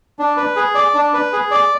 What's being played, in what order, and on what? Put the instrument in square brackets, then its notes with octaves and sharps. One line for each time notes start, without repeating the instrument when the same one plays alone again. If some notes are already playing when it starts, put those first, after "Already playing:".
[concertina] D4
B4
G#4
D5
D4
B4
G#4
D5